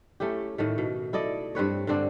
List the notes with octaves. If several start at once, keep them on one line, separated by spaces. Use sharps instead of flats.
A3 C#4 E4 G4
A2 D#3 A3
B2
E4 A4 D5 D#5
G2 C4 B4 C#5
G2 D3 C4 D4